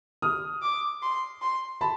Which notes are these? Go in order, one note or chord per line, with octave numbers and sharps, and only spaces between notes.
D#6 F6
D6
C6
C6
A5 B5